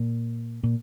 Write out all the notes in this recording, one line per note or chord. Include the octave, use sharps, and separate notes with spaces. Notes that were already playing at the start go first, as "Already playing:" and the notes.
Already playing: A#2
A#2